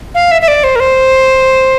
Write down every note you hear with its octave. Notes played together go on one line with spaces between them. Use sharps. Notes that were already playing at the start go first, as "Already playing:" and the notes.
F5
E5
E5
D5
C5
A#4
C5